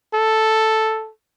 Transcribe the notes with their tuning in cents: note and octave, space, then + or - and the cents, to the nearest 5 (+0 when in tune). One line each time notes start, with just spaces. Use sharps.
A4 +0